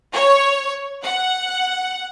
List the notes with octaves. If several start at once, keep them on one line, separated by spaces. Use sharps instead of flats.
C#5
F#5